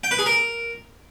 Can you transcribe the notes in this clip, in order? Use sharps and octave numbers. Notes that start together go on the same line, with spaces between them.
G5
B4
G#4
A#4